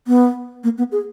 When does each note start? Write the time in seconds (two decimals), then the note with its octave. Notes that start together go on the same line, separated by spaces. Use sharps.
0.07 B3
0.64 A#3
0.78 B3
0.92 G#4